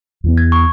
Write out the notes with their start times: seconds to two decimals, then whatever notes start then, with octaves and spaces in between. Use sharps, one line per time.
0.24 E2 E3 B3
0.38 G#6
0.52 C#6